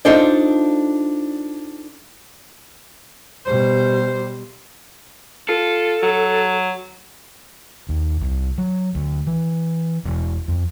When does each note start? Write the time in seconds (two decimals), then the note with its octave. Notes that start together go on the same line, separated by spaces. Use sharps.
0.05 D4 D#4 F4 A4 C5 D5
3.46 B2 G3 C5
5.49 F4 A4
6.03 F#3
7.89 D#2
8.21 C2
8.58 F#3
8.95 D2
9.27 E3
10.05 E1
10.48 F2